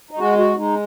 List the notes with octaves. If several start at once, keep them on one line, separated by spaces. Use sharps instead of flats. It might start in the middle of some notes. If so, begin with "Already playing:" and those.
D#4
G#3 F#4
F#4
G#3 D#4